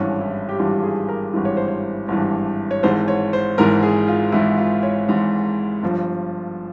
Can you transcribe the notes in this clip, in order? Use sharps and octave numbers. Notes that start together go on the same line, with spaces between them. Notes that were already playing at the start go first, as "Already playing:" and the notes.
Already playing: G#1 G2 E3 C#4
E4
G4
G#1 G2 E3 F4
G#4
A#4
G#1 G2 E3
C#5
C5
C#5
G#1 G2 E3
C#5
G#1 G#2 E3 C5
C#5
C5
G#1 G#2 E3 A#4
G#4
F4
G#1 G#2 E3 E4
F4
C#5
G#1 G#2 E3
G1 G2 F3